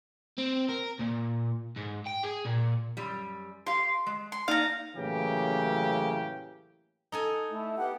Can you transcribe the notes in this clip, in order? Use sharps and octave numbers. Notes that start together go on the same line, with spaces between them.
C4
A#4
A#2
G#2
G5
G#4
A#2
F#2 G3
G4 F5 C6
G#3
C6
A#3 D#4 D5 F5 A#5
A2 C#3 E3 F#3 A#3 G4
D#4 A4 G#5
A3 E4
B3 G4 F#5